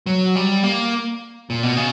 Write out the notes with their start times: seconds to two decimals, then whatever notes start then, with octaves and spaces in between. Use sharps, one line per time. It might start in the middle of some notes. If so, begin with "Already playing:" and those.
0.06 F#3
0.36 G3
0.63 A#3
1.50 A#2
1.63 B2
1.77 C#3